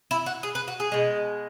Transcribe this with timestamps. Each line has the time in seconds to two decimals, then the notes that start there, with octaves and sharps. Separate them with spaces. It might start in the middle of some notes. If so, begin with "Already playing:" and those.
0.11 E4
0.26 F#4
0.43 G#4
0.55 B4
0.68 F#4
0.80 G#4
0.92 B2 G#3